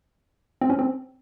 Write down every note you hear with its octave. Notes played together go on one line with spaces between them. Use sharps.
C4
C#4
C4